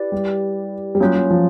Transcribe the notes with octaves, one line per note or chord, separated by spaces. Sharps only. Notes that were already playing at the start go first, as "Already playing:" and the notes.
Already playing: E4 G4 B4 D5
G3
G3
F#3 A#3 C#4 F4
F#3
F3